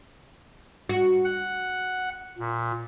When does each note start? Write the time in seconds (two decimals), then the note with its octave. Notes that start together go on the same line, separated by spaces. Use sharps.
0.89 F#4
1.25 F#5
2.39 A#2